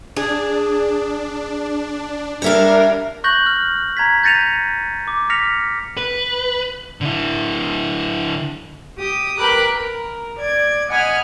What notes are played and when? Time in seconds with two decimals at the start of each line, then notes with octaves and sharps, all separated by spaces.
0.17 D4 G#4
2.42 G3 D4 A#4 C#5 E5 F5
3.24 C#6 F#6 G6 A#6 F#7
3.46 F6
3.97 A#5 G#6 B6
4.23 G6 A6 A#6 C#7 D#7 F7
5.08 D6
5.30 F6 A#6 B6 C#7 F7
5.97 B4
7.01 D3 E4
8.98 G4 D#6
9.39 A#4 B4 G5 B5 D6 F#6
9.75 A#4
10.39 D5 G#6
10.89 D#5 F#5 G#5 B5 F6